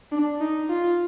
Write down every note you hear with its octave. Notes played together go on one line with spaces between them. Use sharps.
D4
D#4
F4